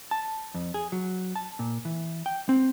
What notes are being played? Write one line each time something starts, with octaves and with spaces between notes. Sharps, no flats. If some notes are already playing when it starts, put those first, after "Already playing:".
A5
F2
G#4
F#3
A5
A#2
E3
G5
C4